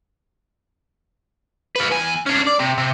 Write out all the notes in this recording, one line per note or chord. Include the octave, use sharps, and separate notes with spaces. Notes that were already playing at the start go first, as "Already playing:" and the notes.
F4 B4
E2 G#5
C#4 D4
D5
C3
C3